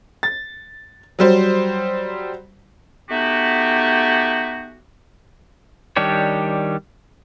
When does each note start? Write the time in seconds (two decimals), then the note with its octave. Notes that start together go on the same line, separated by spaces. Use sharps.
0.23 A6
1.19 F#3 G3 C5
3.10 A3 B3 D#4 F#4 G4
5.96 D#3 G3 D4 G4 C#5